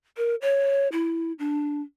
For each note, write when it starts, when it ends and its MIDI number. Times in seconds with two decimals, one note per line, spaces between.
0.17 0.35 70
0.42 0.88 73
0.92 1.33 64
1.39 1.82 62